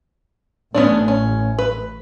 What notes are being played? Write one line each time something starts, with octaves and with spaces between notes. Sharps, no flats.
A1 B3 C#4 D4
C#4
B4